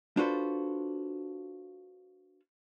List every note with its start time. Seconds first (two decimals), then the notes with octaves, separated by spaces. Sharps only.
0.17 D4 F4 F#4 A4 B4 C5